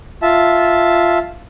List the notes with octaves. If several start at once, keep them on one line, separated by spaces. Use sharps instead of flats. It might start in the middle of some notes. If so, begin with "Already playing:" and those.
F4 E5 A5